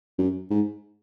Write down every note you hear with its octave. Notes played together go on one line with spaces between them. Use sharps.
F#2
G#2